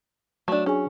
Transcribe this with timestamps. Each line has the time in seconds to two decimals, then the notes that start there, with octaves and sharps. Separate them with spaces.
0.48 F#3 A3 D4
0.66 C#4 D4 G#4 G#5